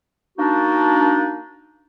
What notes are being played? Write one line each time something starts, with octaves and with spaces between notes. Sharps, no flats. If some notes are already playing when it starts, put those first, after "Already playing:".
A#3 D4 D#4 F#4